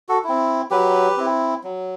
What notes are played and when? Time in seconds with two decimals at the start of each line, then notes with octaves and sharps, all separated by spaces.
0.09 F#4 A4
0.24 C4 E4
0.71 F#3 G4 B4
1.17 C4 E4
1.63 F#3